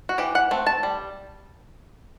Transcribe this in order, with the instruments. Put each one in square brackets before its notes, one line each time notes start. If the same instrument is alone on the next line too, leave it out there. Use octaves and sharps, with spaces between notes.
[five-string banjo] F#4
E3 G4
F#5
A3 C4
A5
G3